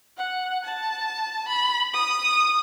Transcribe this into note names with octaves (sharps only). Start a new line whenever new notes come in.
F#5
A5
B5
D#6